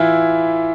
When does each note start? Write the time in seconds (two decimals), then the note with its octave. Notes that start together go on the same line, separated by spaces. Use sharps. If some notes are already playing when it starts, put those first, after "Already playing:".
Already playing: E3 E4 F4